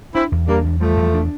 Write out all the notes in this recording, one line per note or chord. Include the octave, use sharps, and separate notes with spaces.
C4 D4 E4
E2
G3 A#3 D4
E2
F3 G3 A3
E2
D4